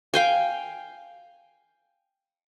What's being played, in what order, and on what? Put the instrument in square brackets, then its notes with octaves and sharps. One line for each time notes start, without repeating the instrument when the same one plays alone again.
[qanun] F5 G5 G#5